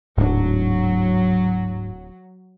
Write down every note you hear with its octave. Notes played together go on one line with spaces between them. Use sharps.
D1 G#2 F#3 D4